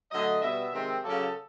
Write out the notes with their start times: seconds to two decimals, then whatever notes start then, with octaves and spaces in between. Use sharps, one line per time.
0.12 D3 F#3 A3 D#5
0.42 B2 G3 B3 E5
0.72 C3 D#3 G#3 C4
1.02 C#3 F#3 A#3 A4